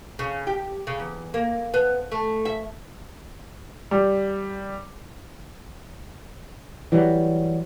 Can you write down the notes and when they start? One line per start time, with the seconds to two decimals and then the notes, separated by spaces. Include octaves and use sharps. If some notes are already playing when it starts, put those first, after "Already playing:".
0.19 C#3
0.47 G4
0.87 C#3
1.00 E2
1.34 A#3
1.74 B3
2.12 A3
2.45 E5
3.91 G3
6.92 E3 F#3 G3